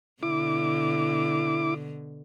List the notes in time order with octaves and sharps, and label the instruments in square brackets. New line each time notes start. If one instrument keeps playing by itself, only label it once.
[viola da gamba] B2 D3 [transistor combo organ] E4 D6